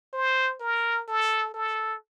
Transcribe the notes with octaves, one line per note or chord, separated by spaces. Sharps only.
C5
A#4
A4
A4